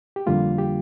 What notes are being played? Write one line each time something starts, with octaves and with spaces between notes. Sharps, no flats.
G4
F2 D3 G3 A#3 F4
G4